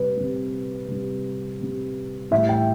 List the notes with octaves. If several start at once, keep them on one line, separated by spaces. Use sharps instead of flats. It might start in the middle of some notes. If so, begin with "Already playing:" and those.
Already playing: C3 G3 B4
C3 G3
C3 G3
C3 G3
A2 E3 G3 E5
G5